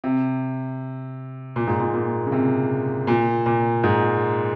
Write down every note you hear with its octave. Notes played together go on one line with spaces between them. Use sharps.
C3
A#2
G#2
A#2
A#2
C#3
C3
A#2
A#2
G#2